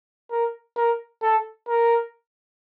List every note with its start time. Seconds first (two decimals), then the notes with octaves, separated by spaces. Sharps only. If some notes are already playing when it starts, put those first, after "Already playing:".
0.31 A#4
0.77 A#4
1.22 A4
1.68 A#4